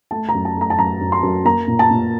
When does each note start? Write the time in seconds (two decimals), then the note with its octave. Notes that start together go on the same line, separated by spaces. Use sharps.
0.11 A3 A5
0.29 A#5
0.34 F#2
0.45 A5
0.56 A3 A#5
0.70 A5
0.79 F#2 A#5
1.00 F#2
1.12 C6
1.23 F#2
1.45 A#3 A#5
1.67 A#2
1.79 A5
1.90 A#2